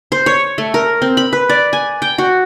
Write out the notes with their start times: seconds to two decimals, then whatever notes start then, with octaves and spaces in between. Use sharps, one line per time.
0.12 C5
0.26 C#5
0.58 A3
0.74 A#4
1.02 C4
1.17 B5
1.33 B4
1.49 D5
1.73 G#5
2.02 G5
2.18 F#4